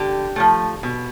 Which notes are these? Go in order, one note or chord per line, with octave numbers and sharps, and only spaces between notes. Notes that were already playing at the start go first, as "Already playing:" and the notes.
Already playing: D3 G4
F3 A3
B2